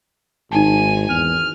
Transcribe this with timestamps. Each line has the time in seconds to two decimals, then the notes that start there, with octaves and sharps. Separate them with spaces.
0.52 G#1 D#4 G#5 A5
1.10 E2 F6